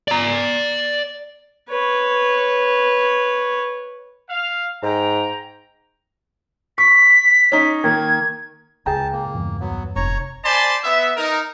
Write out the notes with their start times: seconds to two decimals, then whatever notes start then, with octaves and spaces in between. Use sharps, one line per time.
0.08 D5 A#5
1.69 B4 C#5
4.28 F5
4.83 G#2 G5 A#5
6.78 C#6 B6
7.52 C#4 D#4
7.84 D#3 A#3 G#6
8.86 C#2 G#4 G5 A5 A#5
9.12 A#3
9.35 E2 G2
9.60 F#3 B3
9.96 F1 C#5 A#5 C#6
10.44 C5 D5 G#5 A5 B5 C6
10.84 B3 E5
11.16 D#4 A#4